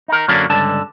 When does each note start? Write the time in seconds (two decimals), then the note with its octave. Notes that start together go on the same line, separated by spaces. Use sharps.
0.08 D#4 A#4
0.28 F#2 D3 F#3 A#3 C#4 D4
0.50 C#2 G2 D3 A5